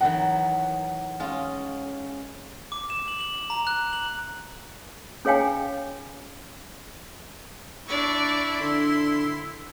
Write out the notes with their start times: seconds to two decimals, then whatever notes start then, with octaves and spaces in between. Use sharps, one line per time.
0.01 D#3 E3 F#3 F#5
1.20 G#3 C#4 F4
2.72 D6
2.90 E7
3.08 F#7
3.21 F#7
3.50 A#5
3.67 F#6
3.93 F#7
5.25 C#4 G#4 C#5 F5 G5 G#5
7.88 D4 E4 D5 C#6
8.60 D3 C6